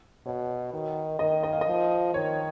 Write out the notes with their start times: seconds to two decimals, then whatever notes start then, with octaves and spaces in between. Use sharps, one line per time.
0.26 B2 C#5
0.73 D#3
1.19 D#3 D#5
1.43 D#5
1.53 F5
1.61 D#5
1.67 F3
2.14 D#3 C#5